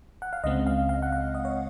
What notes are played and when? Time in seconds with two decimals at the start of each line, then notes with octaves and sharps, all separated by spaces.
0.22 F#5
0.33 F5
0.44 C#2 C#3 G#3 C4 D#5
0.67 F5
0.89 F5
1.02 F#5
1.12 F5
1.35 D#5
1.45 C#5